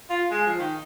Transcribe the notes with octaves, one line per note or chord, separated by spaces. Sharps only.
F4
G#3
F3
D#3